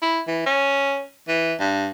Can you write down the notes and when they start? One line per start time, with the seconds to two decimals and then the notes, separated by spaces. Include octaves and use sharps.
0.02 E4
0.28 E3
0.46 C#4
1.28 E3
1.60 G2